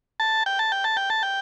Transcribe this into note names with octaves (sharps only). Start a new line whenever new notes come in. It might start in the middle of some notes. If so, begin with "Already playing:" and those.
A5
G5
A5
G5
A5
G5
A5
G5